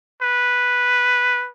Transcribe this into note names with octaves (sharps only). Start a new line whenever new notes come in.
B4